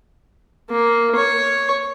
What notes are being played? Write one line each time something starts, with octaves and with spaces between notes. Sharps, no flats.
A#3
C#5